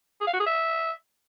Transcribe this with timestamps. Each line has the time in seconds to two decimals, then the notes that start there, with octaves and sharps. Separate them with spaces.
0.21 G#4
0.27 F5
0.33 F#4
0.40 G#4
0.46 E5